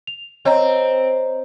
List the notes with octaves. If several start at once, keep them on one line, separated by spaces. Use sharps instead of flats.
F7
C4 C#5 D#5 A#5